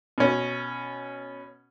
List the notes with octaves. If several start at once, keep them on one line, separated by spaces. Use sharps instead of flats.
B2 C#4